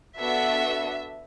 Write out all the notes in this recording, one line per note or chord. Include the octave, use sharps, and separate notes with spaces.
B3 D4 F#4 A4 E5